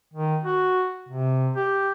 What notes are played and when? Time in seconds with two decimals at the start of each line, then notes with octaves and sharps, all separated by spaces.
0.13 D#3
0.43 F#4
1.09 C3
1.56 G4